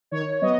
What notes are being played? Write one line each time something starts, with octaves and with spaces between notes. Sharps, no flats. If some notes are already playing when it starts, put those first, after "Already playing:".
D#3 C#5
F#3 B3 D#5